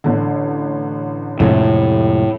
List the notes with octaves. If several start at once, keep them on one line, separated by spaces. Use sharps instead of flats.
A1 D3
F2 A2 C3 G#3